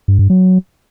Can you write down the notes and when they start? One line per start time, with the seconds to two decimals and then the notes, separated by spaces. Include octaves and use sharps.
0.08 G2
0.19 G2
0.30 F#3